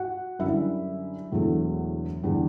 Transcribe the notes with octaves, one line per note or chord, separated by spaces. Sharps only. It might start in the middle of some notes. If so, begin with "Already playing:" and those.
Already playing: F#4 F#5
F#2 D3 G3 E4 E5
E1 E2 D3 F#3 A3
E2 D3 G3